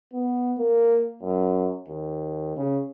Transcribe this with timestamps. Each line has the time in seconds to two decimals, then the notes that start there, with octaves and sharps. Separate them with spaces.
0.14 B3
0.58 A#3
1.23 F#2
1.88 D#2
2.57 C#3